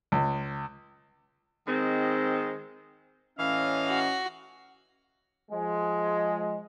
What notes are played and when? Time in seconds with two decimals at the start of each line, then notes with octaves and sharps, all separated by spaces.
0.12 C#2
1.67 D#3 G#3 C4
3.38 A2 E3 C#4 D#5 F5
3.88 F#4
5.51 F3 G#3